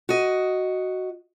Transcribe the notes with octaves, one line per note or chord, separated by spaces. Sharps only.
F#4 D#5